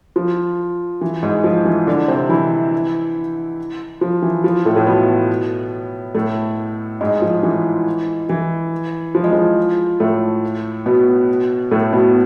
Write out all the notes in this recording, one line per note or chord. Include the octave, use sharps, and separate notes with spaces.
F3
E3
G#2 G#3
F3
E3
D3 D4
C3 C4
E3 E4
F3
E3
F3
A2 A3
A2 A3
B2 B3
A2 A3
G#2 G#3
F3
E3
E3
F3
G#3
F3
A2 A3
B2 B3
A2 A3
B2 B3